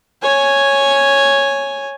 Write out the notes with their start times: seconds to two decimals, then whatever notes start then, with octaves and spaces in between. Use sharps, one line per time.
0.22 C#5 G#5